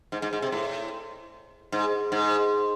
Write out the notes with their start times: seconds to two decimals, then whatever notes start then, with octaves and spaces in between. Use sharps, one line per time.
0.12 G#2
0.22 G#2
0.33 G#2
0.42 C3
0.52 A2
1.72 G#2
2.12 G#2